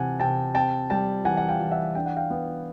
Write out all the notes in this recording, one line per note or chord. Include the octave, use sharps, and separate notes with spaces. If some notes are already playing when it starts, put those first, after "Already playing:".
Already playing: C3 E3 F#5 G#5 A5
C3 G5 A5
C4 G5 A5
G3 G5 A5
E3 F#5 G#5
F#5
F5 G5
E3
E5 F#5
D4 G5
F#5
F5 G5
B3